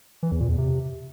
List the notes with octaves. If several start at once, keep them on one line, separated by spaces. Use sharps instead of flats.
E3
E2
A#2
E2
C3